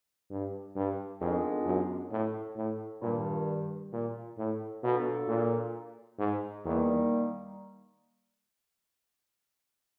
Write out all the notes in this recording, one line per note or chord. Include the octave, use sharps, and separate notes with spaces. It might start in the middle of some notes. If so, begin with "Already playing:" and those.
G2
G2
F2 D#3 G#3 B3 D4 F4
F#2
A2
A2
G2 A#2 D#3 G3
A#2
A2
B2 F#3 A#3 D4 F4 A4
A#2
G#2
E2 D#3 G3 A#3